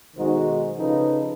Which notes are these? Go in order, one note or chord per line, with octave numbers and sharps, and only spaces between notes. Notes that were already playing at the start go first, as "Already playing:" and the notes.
B1 D#3 G#3 D#4 F#4 C5
C#3 F3 D#4 A4 B4